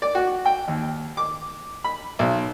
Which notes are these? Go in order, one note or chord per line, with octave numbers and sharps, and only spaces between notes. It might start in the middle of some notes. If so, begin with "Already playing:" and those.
D5
F#4
G5
D#2
D6
B5
B1